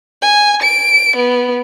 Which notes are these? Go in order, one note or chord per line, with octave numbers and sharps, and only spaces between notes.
G#5
D7
B3